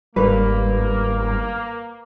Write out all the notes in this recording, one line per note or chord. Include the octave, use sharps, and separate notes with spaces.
G1 G#2 G3 A#3 B4